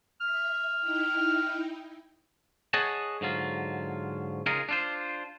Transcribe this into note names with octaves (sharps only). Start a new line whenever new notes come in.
E5 F6
D#4 E4 G5
G#4 C#5 D#5 F#5 A5
G#2 D3 F#3 F4
C#3 D#4 F4 G#4 A#4
D4 F4 C5